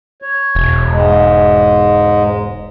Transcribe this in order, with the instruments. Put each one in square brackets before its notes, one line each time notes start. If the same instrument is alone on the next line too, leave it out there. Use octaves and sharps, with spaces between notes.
[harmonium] C#5
[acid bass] E1
[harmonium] G#2 G#3